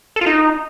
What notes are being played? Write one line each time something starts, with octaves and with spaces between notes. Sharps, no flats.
A4
F4
D#4